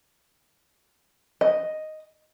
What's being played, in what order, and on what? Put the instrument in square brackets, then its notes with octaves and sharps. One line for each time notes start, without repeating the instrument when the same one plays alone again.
[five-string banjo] D#5